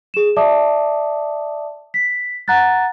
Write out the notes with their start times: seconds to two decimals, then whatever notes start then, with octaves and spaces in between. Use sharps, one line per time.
0.14 G#4 E7
0.37 D5 E5 A5 D6 D#6
1.94 B6
2.48 F#5 A#5 F#6 A6